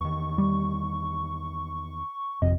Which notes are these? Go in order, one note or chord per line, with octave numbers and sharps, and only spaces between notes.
E2 D#3 C#6
G3
G#1 F2 C3 D#5